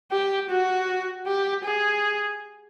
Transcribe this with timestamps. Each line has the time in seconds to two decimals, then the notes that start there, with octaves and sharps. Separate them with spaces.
0.12 G4
0.50 F#4
1.27 G4
1.64 G#4